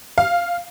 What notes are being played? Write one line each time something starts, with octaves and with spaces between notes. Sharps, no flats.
F5